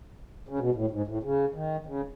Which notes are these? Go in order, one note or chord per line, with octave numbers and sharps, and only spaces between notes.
C#3
B2
A2
G#2
A2
C#3
D#3
C#3